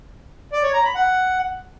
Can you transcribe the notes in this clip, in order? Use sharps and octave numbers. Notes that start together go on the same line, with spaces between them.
D5
C#5
A#5
B5
F#5